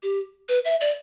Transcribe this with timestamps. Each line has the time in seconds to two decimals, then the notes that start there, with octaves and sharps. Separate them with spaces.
0.03 G4
0.49 B4
0.65 E5
0.81 D5